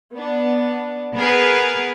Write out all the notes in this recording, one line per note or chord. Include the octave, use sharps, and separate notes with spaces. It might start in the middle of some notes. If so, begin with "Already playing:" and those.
B3 D4
B3 G#4 A#4 B4